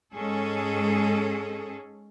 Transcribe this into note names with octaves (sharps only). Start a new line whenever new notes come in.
G#2 G#3 C#4 G#4 A4